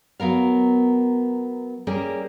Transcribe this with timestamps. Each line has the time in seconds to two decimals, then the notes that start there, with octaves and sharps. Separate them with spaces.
0.20 F#3 B3 A#4 F5
1.87 G3 A#3 C#4 G4 G#4